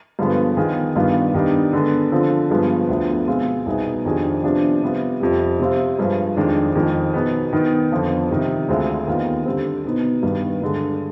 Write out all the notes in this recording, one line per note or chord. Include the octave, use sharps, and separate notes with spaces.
G2 D3 F3 G#3 B3
D#3 B3 F4 G#4
G2 D#3 B3 D4 F4
D#3 G3 B3 D4
D3 G#3 B3
D3 F3 C4 F4
G2 F3 G#3 B3
D2 D3 F3 B3
B2 G#3 C4 F4
C2 B2 B3 D#4 G#4
F2 D#3 G3 D4 G#4
C3 F3 B3 D4 G#4
C3 G3 B3 F4
F2 C3 G3
C3 G3 C4 F4
G2 F3 G#3
F2 D#3 G#3 D4 G#4
F2 D#3 G#3
B2 B3 D#4 G#4
D#3 B3 D#4
F2 D3 F3 B3
C3 D#3 G3
D2 D3 G#3 C4 F4
D#2 D#3 B3 F4
D3 G3 C4
B2 B3 D#4
G2 D#3 B3
G2 D3 G#3